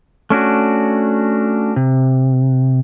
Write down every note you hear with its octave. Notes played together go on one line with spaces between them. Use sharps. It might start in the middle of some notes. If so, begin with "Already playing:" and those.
A3 C#4 D4 F#4
C3